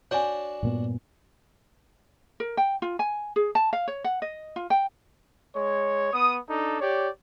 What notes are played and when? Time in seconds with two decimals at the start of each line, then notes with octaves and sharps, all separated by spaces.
0.11 D4 F#4 C#5 G#5 A5
0.62 G2 A#2 B3
2.40 A#4
2.57 G5
2.82 F4
2.99 G#5
3.36 G#4
3.55 A5
3.73 F5
3.88 C#5
4.04 F#5
4.22 D#5
4.56 F4
4.70 G5
5.56 G#3 C#5
6.13 B3 D#6
6.48 D4 D#4 A4
6.80 G4 C#5 D5